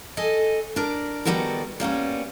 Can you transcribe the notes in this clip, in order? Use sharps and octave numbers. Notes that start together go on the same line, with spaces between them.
A4 D#5 G#5
D4 A#4
D#3 G3 B3 F#4 A4 A#4
G3 A#3 B3 C#4